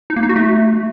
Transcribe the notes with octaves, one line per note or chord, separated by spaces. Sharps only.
D#4
A#3
D#4
F#4
A3